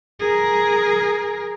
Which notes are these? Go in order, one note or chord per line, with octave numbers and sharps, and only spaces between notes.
G#4 A#4